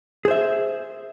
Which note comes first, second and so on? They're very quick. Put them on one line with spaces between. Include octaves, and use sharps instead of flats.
G#4 C5 E5